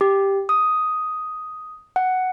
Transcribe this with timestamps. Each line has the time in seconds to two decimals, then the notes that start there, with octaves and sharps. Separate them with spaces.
0.01 G4
0.49 D#6
1.96 F#5